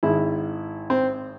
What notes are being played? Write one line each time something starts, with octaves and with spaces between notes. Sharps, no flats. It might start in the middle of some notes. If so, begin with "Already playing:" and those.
G#1 G#2 G#3 E4
C4